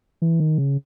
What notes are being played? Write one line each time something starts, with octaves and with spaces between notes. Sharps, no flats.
E3
D#3
C#3